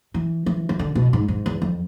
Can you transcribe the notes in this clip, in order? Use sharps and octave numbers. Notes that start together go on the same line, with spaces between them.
E3
E3
E3
D3
B2
G#2
G#2
E2
F2